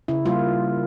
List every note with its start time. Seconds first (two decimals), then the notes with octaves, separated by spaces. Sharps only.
0.08 C#3 E4
0.26 G3 A#3 F4